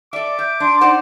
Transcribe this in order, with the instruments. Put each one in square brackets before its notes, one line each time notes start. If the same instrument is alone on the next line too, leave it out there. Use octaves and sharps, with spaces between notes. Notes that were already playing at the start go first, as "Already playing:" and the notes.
[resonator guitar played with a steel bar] A4 E5 [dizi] D5 [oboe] D6
[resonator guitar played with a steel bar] E5 [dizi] G6
[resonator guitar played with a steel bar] D4 [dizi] C6
[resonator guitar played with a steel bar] D#4 C5 D5 [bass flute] F#5